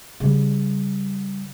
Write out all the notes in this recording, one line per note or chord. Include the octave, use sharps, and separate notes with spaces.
C#3 G3